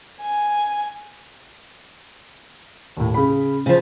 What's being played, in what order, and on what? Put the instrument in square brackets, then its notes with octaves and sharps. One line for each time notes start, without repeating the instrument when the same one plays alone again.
[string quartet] G#5
[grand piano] D#2 A2
C#3 B5
[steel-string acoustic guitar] C#3 F3